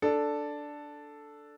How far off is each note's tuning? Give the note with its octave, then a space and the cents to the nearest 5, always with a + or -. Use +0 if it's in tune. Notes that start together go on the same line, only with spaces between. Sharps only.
D4 +0 A4 +0